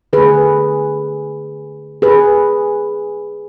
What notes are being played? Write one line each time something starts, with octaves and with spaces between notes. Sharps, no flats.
D3 A3 G#4 B4
G#4 B4